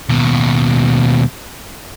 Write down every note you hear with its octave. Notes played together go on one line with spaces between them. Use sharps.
D#2 B2